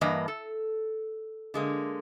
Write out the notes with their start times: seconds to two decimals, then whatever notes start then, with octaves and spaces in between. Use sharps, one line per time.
0.01 G2 E3 A#3 B4 D#5 A#5
0.28 A4
1.54 D3 G#3 A#3